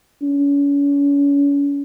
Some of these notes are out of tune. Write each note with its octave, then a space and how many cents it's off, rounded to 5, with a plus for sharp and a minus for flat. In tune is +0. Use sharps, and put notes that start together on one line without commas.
C#4 +35